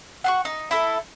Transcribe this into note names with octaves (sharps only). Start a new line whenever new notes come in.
F#5 C6 C#6
D#4
E4 A4